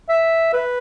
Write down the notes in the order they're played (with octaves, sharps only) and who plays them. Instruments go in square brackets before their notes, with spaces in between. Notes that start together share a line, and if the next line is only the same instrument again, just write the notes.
[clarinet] E5
B4